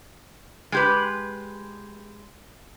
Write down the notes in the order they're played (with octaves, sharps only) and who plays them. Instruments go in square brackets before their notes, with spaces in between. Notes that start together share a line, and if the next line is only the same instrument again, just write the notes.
[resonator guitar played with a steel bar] G#3 G4 B4